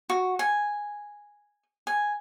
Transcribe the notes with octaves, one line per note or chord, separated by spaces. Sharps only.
F#4
G#5
G#5